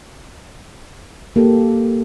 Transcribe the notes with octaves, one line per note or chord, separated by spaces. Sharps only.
A#3 G4 A4